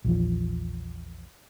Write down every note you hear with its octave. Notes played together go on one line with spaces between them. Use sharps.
A#1 E2 F3